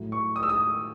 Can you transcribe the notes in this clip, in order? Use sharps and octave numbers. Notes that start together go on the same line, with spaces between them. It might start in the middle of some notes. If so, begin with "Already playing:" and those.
Already playing: A2 F#3
C#6
D#6
E6
D#6